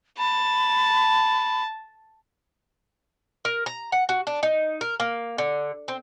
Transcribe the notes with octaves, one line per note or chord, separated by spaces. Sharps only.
A5 B5
A#4
A#5
F#5
F#4
D4
D#4
A#4
A#3
D3
C4